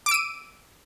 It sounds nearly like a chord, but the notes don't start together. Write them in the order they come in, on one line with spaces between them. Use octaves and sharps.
D6 D7 E6 D#7